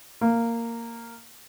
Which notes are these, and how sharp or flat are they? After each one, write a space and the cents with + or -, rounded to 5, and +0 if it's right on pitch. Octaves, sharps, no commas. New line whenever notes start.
A#3 -10